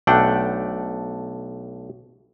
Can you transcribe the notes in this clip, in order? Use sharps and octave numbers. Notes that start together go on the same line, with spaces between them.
B1 A3 D4 F#5 G5